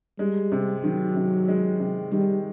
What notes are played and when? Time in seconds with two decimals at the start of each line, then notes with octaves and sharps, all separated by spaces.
0.19 G3 G#3
0.52 C3
0.83 D#3 F#3
1.16 C3
1.48 G#3
1.80 C3
2.12 D#3 G3